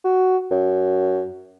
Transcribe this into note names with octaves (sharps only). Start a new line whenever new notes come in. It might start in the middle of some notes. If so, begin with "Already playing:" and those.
F#4
F#2